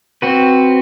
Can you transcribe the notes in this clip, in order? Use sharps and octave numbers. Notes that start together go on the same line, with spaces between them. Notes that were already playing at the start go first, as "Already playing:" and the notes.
C4 F#4 B4